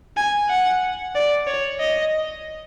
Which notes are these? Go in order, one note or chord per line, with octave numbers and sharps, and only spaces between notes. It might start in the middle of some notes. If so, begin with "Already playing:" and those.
G#5
F#5
D5
C#5
D#5